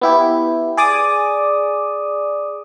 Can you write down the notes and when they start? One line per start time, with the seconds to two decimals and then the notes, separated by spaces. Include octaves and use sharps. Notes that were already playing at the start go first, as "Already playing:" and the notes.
0.02 B3 E4 G4
0.77 G#4 D5 D6 D#6